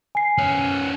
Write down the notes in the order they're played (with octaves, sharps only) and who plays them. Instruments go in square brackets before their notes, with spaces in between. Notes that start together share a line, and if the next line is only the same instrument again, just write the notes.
[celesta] G#5 C7
[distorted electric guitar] B3 C#4